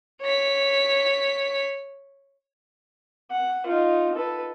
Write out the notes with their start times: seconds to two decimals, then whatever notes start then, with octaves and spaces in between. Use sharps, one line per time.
0.22 C#5 B6
3.30 F#5
3.66 D#4 F4
4.14 A4 B4